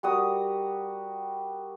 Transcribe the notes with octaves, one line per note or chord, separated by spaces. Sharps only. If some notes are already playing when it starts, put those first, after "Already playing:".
G3 F#4 A#4 D#6